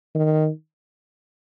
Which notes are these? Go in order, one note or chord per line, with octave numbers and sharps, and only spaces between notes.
D#3